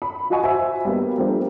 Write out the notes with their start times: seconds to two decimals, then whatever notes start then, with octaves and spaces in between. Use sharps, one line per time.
0.02 B5
0.30 F4 F#4 D#5 F#5 G#5 C#6
0.44 F#4 C5 E5 G#5
0.85 G3 A#3 B3
1.18 F3 G3 A3 A#3 C4 D4